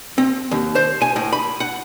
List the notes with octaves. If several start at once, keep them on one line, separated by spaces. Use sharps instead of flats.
C4
D#2
C5
G#5
A2
B5
F#5